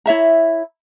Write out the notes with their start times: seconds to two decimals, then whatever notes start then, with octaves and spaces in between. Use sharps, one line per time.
0.06 E4 C#5 E5 A#5